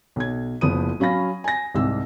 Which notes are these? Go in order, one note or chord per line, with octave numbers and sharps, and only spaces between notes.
B1 G#6
F#1 F3 B3 D#6 D#7
F#3 C#4 F5 B5 A#6
G#5 A#6
C2 G#2 E6